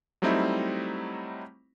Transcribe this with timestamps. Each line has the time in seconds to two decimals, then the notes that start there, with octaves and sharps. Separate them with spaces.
0.22 F#3 G3 A3 C4 D#4 E4